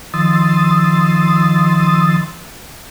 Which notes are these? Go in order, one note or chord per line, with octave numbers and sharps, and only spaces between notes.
D#3 F3 C6 D#6 E6 A6